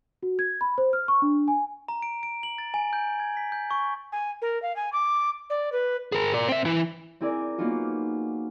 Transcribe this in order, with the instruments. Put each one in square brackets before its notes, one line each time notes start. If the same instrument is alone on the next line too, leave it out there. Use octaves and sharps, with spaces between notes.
[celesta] F#4
G#6
B5
C5
F6
C#6
D4
G#5
[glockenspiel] A#5
D7
D7
F#7
A6
G#5
G6
G#6
B6
G6
C#6
[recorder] G#5
A#4
F5
G#5
D6
D5
B4
[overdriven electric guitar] G#4 A#4
A#4 D5
C4 E5
E3 E4
[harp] C4 E4 G#4 A#4 D5
A#3 B3 C#4 D#4 F4 F#4